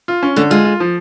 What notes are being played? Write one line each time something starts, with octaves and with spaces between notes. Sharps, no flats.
F4
C#4
D3 A3
G#3 F4
F4
F3